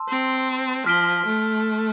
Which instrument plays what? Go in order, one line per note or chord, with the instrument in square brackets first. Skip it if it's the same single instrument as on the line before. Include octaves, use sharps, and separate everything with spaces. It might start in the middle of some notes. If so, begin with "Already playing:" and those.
Already playing: [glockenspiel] A5 C6 E6
[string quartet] C4
[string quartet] F3 [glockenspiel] F6 B6 D7 G7
[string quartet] A3